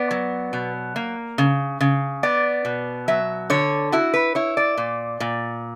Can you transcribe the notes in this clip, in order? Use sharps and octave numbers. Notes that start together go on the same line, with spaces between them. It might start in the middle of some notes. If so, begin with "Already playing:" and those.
Already playing: B3 D5
F#3
B2
A#3
C#3
C#3
B3 D5
B2
F#3 E5
D3 C#5
E4 F#4
B4
E4 C#5
D5
A#2
A#2